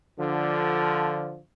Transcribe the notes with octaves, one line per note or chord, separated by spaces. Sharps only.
D3 F3